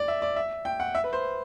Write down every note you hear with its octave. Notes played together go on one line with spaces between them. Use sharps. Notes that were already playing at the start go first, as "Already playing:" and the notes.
Already playing: D5
E5
D5
E5
G5
F#5
E5
B4
C5